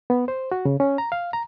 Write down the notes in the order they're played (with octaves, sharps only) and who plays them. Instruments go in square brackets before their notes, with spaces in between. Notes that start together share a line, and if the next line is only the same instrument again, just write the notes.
[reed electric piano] B3
C5
F#4
C#3
C#4
A#5
F5
A#5